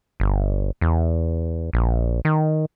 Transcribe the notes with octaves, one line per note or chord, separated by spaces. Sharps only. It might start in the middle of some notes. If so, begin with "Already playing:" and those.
G1
E2
A#1
D#3